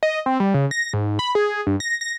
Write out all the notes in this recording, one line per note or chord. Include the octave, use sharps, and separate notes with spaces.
D#5
C4
G3
C#3
A#6
G#2
B5
G#4
G2
A#6
A#6